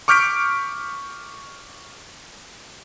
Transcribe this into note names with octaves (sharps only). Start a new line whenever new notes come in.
C#6 D6 F6 G6 B6 D7